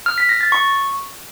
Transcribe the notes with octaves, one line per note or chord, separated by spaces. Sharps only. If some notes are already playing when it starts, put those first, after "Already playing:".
F6
B6
A#6
A6
C#6